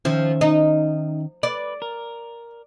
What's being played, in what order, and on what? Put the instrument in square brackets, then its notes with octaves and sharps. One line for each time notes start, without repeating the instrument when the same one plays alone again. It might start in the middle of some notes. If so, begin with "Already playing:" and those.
[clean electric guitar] D#3 C#4 E5 [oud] F3
[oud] D#4
[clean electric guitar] B4 [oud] D5
[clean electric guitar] A#4